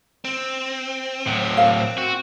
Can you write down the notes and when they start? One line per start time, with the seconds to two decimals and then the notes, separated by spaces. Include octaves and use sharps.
0.25 C4
1.27 A2 F#3
1.57 A#4 F5 F#5
1.98 F#4